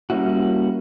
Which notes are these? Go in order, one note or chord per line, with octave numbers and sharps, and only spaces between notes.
G3 A#3 C#4 E4 F#4